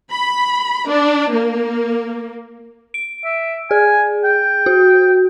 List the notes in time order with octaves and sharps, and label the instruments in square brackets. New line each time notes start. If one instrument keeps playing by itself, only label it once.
[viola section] B5
D4
A#3
[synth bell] D7
[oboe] E5
[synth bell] G#4 [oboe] G#5
[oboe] G5
[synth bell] F#4